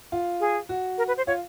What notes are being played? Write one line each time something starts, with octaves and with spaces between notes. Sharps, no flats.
F4
G#4
F#4
A#4
B4
C5
F4 C#5